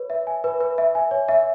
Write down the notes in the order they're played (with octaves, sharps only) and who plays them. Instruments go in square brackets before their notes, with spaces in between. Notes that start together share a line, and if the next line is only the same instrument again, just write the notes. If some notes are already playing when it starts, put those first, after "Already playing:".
Already playing: [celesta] B4 C#5
E5
G#5
B4
B4
E5
G#5
C#5
E5